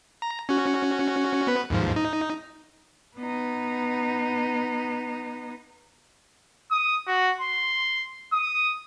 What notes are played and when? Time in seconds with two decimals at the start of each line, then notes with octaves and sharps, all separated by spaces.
0.22 A#5
0.49 C#4 F#4
1.47 B3 B4
1.70 D#2 G#2 F3
1.96 D#4
3.16 B3 D#4
6.71 D#6
7.07 F#4
7.41 C6
8.33 D#6